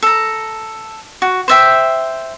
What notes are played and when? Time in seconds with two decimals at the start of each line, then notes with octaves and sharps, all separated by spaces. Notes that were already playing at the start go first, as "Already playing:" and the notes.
0.02 A4 A#5
1.22 F#4
1.48 C5 E5 G5